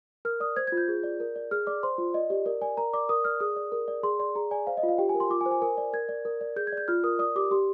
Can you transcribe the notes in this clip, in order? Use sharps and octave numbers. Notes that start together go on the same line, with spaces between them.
A#4 F6
D5 D#6
C5 G#6
G#6
F4
G6
G#4
D5
A#4
D5
G#4 F6
D5 D6
C5 C6
F4
D5 D#5
G4 D5
A#4 D5
D5 G#5
A#4 A#5
D5 D6
A#4 D#6
D5 F6
G#4 D#6
D5
A#4
D5
G#4 C6
D5 C6
G#4 A#5
D5 G#5
C5 F5
D#5
F4
F5
G4 G5
G#5
A#4
C6
F4 D6
G#5
C5
G#5
A#4 G#5
D5
A#4 G#6
D5
A#4
D5
G#4 G6
G#6
D5 G6
F4 F6
A#4 D#6
D5 D#6
G4 D6
G4 C6